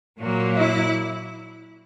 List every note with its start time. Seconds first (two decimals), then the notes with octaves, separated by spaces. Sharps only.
0.19 A#2 F#3 A#3
0.56 E4